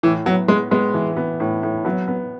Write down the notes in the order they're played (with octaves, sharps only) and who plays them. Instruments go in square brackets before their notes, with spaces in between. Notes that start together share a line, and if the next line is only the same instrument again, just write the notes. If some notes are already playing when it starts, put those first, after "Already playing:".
[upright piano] A2 [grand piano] E3
[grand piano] F#3 [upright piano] B3
[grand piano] G#3 [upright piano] B3
[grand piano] G#3 [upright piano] B3
[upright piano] E3
B3
A2
A2
[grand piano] F#3 [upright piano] B3
[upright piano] B3